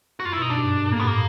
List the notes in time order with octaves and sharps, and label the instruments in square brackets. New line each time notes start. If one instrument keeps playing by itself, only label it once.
[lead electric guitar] F#4
[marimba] F#2 [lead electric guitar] F4
[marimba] B2 [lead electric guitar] E4
[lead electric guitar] D#4
[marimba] B2 [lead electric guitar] D4
[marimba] G2
A#2
A2
[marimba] A2 [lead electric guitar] A#3
[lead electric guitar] B3
[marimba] G2
[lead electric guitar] A#3